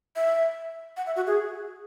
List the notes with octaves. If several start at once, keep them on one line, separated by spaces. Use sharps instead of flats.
E5
F#5
E5
F#4
G#4